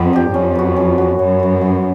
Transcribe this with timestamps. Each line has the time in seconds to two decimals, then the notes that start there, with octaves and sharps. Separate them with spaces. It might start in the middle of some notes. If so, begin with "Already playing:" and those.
Already playing: F2 B3
0.13 D4 G4
0.34 F2 C#4
0.55 F#4 B4
0.76 C#4
0.98 F#4 B4
1.19 F#2 C#4
1.39 F#4 B4
1.61 C#4